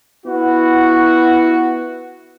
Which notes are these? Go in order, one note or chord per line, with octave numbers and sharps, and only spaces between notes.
B3 E4 F#4